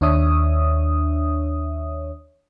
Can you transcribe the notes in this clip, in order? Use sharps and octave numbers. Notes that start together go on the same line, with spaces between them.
D#2 D4 C#5 E5 D#6